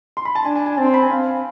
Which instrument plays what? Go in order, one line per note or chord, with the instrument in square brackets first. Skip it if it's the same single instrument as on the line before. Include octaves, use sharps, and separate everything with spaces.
[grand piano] C6
B5
A5
[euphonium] D4 [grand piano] G#5
[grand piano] G#5
G#5
[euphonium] C4 [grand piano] A5
[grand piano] C6
B5
G#5
[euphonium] C4 [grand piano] F5